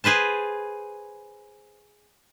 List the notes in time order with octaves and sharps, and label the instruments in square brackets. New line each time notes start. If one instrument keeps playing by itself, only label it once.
[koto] G#4 B4 C5 A5